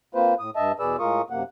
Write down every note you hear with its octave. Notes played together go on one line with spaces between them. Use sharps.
A#3 C4 F4 B4 C5
A2 D#6
G2 D#5 E5 A5
E2 B2 G#4 B4 D5 E6
A2 G#3 F4 A#4 C#6 D#6
F#2 C3 A#3 F#5